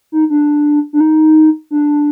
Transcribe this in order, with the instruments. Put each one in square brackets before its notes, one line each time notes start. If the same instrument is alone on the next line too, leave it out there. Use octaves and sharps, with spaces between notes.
[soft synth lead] D#4
D4
D4
D#4
D4